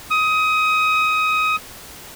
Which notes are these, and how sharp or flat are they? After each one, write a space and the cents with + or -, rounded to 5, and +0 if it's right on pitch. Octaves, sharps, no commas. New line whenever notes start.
D#6 +20